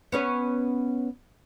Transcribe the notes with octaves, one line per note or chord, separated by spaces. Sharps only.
B3 C#4 C#5